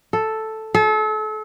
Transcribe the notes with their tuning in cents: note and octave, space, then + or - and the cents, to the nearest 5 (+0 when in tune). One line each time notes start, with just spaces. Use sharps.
A4 +0
A4 -35